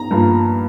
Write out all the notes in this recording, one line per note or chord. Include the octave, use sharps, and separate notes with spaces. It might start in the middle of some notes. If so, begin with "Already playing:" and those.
Already playing: A#5
G2 F3 A#3